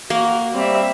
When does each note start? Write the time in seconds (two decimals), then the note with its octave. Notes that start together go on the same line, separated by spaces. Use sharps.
0.10 A#3 F#4
0.54 G3 C4 E5